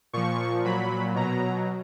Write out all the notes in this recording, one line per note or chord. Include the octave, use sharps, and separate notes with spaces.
A#2 F3 C#6
A#2 F#3 B5
B2 F#3 A#5